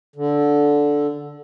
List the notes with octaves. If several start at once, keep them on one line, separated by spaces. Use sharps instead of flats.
D3